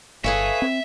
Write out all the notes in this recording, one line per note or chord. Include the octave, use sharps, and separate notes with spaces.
G1 G#4 A4 B4 C#5 E5 F5 G#5
C4